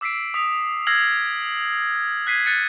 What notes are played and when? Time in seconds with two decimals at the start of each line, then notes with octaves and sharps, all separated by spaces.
0.01 D6 E6 B6 C7 D7
0.34 D#6 B6 F7
0.87 E6 F6 G#6 A#6 C7 F#7
2.27 F#6 G#6 B6 C7 D#7
2.46 F#6 A6 C#7 D#7